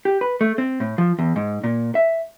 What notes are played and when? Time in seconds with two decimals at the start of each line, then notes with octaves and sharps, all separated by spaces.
0.05 G4
0.21 B4
0.41 A3
0.58 C4
0.80 A2
0.98 F3
1.19 E2
1.36 G#2
1.64 A#2
1.95 E5